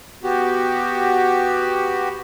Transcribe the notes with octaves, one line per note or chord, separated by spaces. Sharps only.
B3 F#4 G4